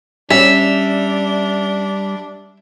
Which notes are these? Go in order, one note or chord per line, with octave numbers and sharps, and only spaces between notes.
G3 C#4 D4 E5